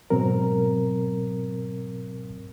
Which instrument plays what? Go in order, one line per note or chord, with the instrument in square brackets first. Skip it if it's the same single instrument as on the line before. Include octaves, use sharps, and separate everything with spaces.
[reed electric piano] G#2 B2 F#3 C4 A#4